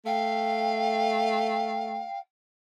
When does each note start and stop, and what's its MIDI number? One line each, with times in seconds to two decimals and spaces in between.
0.06 2.04 57
0.06 2.19 77
0.06 2.20 79